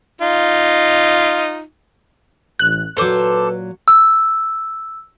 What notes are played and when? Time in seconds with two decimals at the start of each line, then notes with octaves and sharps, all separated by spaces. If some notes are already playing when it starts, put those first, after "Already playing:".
0.21 D#4 F4
2.59 A1 F#6
2.97 A#2 F#3 A4 B4 C5 D6
3.88 E6